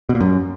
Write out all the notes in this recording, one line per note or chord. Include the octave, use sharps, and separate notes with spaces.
B2
A#2
F#2